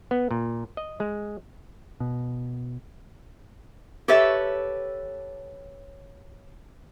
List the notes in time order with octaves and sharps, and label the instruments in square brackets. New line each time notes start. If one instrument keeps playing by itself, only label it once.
[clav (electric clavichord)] B3
A#2
D#5
G#3
[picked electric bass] B2
[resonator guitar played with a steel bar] G4 A4 B4 C#5 E5